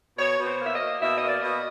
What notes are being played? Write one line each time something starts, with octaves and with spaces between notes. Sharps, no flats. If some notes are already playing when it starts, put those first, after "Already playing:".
B2 C#5
B2
C5
A#3
E5
D#5
A#3
B2 E5
D#5
A#3
D5
B2 D#5